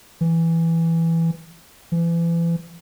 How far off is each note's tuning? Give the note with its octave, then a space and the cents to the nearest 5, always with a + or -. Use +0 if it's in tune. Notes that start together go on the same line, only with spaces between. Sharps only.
E3 +5
E3 +35